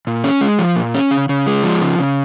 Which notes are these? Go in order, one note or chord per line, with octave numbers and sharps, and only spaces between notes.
A#2
C#4
G#3
F3
A#2
C#4
C#3
C#3
G#3
F3
C#3
C#3